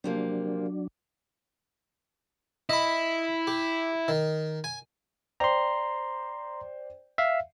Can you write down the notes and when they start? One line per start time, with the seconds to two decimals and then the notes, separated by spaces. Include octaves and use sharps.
0.04 C3 F3 F#3 A#3 D4
2.69 E4 D#5 B5
3.47 G4
4.08 D#3
4.64 G#5
5.40 C5 D5 G5 A#5 C6
7.18 E5 F5